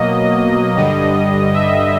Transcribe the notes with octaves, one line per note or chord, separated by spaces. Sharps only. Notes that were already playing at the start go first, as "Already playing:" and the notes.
Already playing: B2 F#3 A#3 D#5
G2 D3 G3
E5